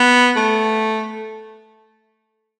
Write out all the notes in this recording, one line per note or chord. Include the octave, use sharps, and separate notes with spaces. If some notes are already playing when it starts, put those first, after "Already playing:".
Already playing: B3
A3